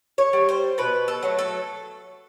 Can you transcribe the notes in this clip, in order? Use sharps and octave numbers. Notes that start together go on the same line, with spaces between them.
C#5
G3
C5
B2 B4
A4
F#3 A3
A4